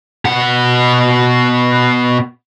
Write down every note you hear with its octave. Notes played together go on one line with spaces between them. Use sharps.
B2 F#5